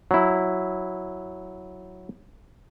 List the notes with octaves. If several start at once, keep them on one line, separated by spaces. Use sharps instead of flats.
F#3 E4